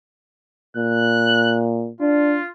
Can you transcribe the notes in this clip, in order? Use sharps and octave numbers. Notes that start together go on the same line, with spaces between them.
A#2 F#6
D4 F4